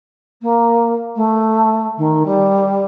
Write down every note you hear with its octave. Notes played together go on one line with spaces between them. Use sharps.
A#3
A3
D#3
G3